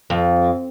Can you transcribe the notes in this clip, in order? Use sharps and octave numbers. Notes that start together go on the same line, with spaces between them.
F2